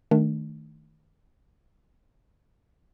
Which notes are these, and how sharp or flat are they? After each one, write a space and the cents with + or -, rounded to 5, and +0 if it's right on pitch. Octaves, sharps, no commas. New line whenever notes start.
D#3 +0 A3 +0 D4 +15